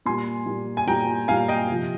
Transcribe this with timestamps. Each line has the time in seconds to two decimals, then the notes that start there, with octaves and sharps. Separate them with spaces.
0.06 A#2 G3 G#5 C6
0.46 A#2 G3
0.77 G#5
0.87 A#2 G3 G5 A#5
1.28 A#2 G3 F5 G#5
1.48 D#5 G5
1.70 C3 F3